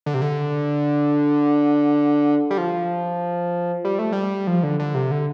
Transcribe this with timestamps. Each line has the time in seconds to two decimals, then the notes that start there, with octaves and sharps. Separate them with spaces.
0.06 D3
0.14 C3
0.22 D3
2.50 G3
2.58 F3
3.85 G3
3.99 A3
4.13 G3
4.47 F3
4.63 D3
4.79 D3
4.95 C3
5.11 D3